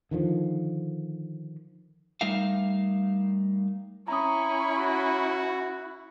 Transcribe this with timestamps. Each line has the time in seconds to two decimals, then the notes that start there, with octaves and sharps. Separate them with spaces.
0.11 D3 D#3 F3
2.21 G3 A3 D#4 A#4 E5 F5
4.08 C#4 E4 A#5 C#6 D#6
4.79 F#4